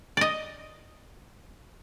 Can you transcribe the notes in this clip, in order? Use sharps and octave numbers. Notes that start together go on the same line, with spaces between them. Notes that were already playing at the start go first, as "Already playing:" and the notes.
D5 D#5